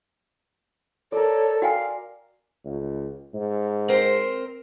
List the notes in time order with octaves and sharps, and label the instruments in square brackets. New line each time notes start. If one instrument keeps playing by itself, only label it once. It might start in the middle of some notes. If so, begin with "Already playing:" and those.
[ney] A4 [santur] A#4 D5 [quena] C#5
[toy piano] F#4 G5 G#5 [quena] F5 [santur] C6
[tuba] C#2
G#2
[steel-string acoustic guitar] C4 A#4 C5